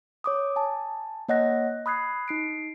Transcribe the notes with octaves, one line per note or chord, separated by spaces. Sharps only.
C#5 D6 D#6
G#5 A5
A#3 C#5 D#5 F#5 F#6 A#6
B5 D#6 F#6 G#6 C7
D#4 C7 D7